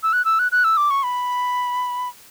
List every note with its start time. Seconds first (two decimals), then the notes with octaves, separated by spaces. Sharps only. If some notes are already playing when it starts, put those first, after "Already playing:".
0.03 E6
0.13 F#6
0.25 E6
0.39 F#6
0.52 F#6
0.64 E6
0.77 D6
0.90 C#6
1.03 B5